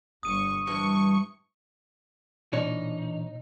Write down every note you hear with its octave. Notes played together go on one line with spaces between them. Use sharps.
G1 C#6 D#6 D#7
G2 E3 C#6
A#2 E3 D4 D#4 C#5